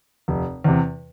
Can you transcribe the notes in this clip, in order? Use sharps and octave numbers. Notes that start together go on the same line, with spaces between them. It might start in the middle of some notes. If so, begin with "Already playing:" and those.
F1
E2 C3